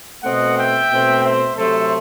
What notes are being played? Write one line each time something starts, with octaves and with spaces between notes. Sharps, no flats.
B2 A3 C4 D#5 F#5
E5 G5
B2 A3 C4
C5 E5
C3 F#3 A3 A4 C5